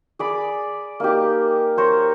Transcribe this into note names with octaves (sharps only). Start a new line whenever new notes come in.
G#4 D5 B5
A#3 D#4 G4
A#4 C5 C#5 A#5